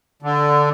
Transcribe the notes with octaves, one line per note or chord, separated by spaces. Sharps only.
D3